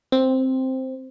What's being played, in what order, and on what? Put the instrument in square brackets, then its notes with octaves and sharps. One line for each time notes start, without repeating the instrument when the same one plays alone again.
[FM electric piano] C4